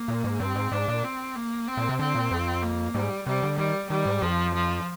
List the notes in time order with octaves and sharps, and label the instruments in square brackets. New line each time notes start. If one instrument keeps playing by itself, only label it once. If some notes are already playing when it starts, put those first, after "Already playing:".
Already playing: [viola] A#3
[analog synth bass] A#2
G#2
[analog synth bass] G2 [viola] C4
[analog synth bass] G#2
[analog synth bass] G#2 [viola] D4
[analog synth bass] A#2
[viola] C4
A#3
C4
[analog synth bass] A#2
C3
[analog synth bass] D3 [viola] C4
[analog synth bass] A#2
F2
[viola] A#3
[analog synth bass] G#2 [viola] G3
[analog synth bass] C3 [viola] G3
[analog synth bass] D3
[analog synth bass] D#3 [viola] G3
[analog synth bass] D#3 [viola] G3
[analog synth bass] G#2
[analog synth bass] F2 [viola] F3
[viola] F3